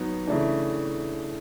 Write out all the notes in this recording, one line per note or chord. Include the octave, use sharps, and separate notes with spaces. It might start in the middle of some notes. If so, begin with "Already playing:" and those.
Already playing: F#3 B3 D#4
C#3 E3 A3 D4